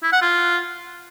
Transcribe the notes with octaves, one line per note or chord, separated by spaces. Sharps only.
E4
F#5
F4